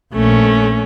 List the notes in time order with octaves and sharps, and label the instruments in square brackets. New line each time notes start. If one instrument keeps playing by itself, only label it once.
[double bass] A#1 [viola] A3 C#4